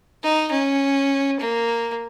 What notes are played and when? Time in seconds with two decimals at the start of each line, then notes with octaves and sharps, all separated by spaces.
0.23 D#4
0.51 C#4
1.40 A#3